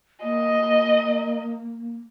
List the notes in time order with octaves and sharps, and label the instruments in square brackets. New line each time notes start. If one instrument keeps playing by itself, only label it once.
[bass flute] A#3 [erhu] D#5